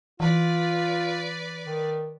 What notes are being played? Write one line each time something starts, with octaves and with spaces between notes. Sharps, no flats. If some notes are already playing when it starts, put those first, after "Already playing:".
E3 F4 B4 D5
D#3